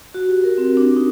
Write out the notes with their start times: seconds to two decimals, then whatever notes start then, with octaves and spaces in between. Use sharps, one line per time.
0.14 F#4
0.29 G4
0.44 A#4
0.58 C4
0.77 D4
0.96 D#4